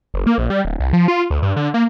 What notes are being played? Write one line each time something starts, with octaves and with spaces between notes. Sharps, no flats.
F#1
A#3
A#1
G3
D1
C2
F3
F4
D2
G2
D3
A#3